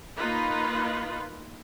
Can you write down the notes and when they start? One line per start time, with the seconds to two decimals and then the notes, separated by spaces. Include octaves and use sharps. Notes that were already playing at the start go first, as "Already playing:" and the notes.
0.16 A#3 D#4 F4 B4